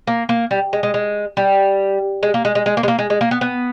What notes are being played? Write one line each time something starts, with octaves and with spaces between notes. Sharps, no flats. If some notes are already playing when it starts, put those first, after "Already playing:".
A#3
A#3
G3
G#3
G#3
G#3
G3
G#3
A#3
G#3
G#3
G#3
A#3
G#3
A#3
G#3
G#3
A#3
B3
B3